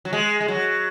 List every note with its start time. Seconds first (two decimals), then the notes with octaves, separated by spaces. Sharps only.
0.05 F#3
0.13 G#3
0.41 G#3
0.48 F#3